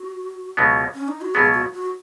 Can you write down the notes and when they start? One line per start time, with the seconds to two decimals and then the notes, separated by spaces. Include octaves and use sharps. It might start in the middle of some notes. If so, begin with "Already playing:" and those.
Already playing: F#4
0.57 C#2 B2 F#3 B3
0.95 C#4
1.08 D#4
1.21 F#4
1.34 C#2 B2 F#3 B3 G#4
1.54 F#4
1.73 F#4